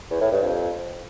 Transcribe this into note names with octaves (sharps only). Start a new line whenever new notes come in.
E2
A2
G2
F2